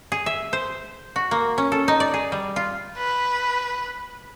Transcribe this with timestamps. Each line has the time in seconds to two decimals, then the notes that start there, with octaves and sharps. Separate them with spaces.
0.12 G#4
0.26 E5
0.53 C5
1.16 F#4
1.31 A#3
1.58 C#4
1.72 A4
1.88 D#4
2.00 D5
2.14 G#4
2.32 G3
2.56 F4
2.98 B4